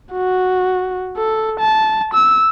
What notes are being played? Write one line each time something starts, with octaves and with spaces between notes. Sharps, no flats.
F#4
A4
A5
E6